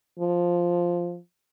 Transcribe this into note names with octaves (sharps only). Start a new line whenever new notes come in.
F3